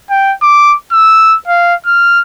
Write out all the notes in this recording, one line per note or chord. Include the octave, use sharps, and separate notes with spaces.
G5
D6
E6
F5
F6